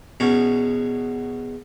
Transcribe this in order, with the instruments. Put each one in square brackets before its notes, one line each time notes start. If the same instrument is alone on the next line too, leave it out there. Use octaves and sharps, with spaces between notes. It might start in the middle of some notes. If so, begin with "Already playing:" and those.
[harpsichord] E2 B2 C#4